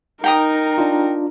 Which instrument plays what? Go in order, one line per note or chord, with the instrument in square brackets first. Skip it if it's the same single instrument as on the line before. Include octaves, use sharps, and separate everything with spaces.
[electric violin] D#4 A#4 [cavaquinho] G5 A#5 D#6
[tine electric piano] D4 F4